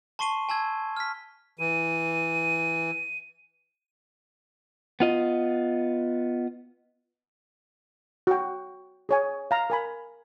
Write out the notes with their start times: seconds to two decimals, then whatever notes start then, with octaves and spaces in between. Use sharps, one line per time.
0.19 A5 C6 C#6 C7 D#7 G7
0.49 G#5 A5 E6 G#6
0.97 F6 B6
1.59 E3 D#7
5.00 B3 F4 D#5
8.27 F#4 G5
9.09 G#4 C#5 G#5
9.51 F5 A#5
9.70 A#4 G#5 B5